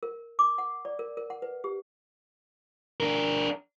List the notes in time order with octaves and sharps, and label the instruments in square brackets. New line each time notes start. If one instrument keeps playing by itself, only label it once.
[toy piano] A#4
D6
F#5
D5
A#4
A#4
F#5
B4
G4
[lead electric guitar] D4 A#4